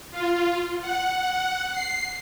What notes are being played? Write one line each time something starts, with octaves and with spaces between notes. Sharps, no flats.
F4
F#5
F#5
C7